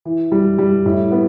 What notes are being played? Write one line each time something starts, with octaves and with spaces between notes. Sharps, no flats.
E3
G3
G3
A2
B3